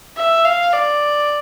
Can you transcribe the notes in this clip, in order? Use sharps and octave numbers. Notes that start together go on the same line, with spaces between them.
E5
F5
D5